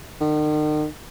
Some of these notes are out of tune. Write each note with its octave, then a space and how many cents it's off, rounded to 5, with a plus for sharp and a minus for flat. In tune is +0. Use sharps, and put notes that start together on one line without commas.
D#3 -40